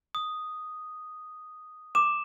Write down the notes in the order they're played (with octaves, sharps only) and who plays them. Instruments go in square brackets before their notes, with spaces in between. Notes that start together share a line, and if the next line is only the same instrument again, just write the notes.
[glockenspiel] D#6
[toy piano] D6 [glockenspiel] E7